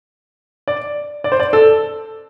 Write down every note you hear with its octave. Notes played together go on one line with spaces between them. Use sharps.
D5
D5
C5
D5
A4